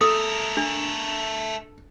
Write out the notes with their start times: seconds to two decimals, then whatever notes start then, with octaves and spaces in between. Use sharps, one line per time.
0.01 A3 A4 A#4 D#6
0.57 D4